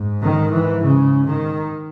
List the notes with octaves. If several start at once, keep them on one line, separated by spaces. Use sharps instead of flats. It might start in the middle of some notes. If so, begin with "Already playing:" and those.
Already playing: G#2
D#3
E3
C#3
D#3